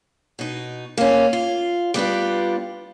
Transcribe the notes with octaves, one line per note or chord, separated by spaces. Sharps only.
B2 D#4
A#3 C#4
F4
G3 B3 D4 F4